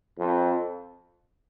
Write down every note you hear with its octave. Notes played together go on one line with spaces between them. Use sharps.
F2